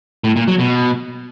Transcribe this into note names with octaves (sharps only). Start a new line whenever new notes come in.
A2
A#2
F#3
B2